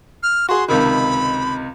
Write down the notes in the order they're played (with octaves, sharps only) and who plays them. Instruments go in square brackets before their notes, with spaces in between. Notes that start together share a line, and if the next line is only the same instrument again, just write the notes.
[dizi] F6
[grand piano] F#4 G#4 [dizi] C6
[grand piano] C#2 C3 D#3 [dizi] B5